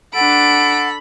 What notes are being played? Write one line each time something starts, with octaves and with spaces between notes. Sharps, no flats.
D4 A4 F#5 B5 D7